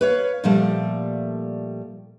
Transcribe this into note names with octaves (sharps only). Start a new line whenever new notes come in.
B4 C#5 F5
A#2 F3 G3 A3